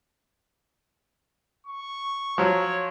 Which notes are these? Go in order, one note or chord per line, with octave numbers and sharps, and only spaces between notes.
C#6
F3 F#3 C#5